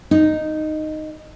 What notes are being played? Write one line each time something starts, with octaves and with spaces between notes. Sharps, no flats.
D#4